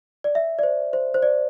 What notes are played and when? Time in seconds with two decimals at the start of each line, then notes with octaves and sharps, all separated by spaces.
0.24 D5
0.35 E5
0.59 D5
0.63 C5
0.93 C5
1.14 C5
1.22 D5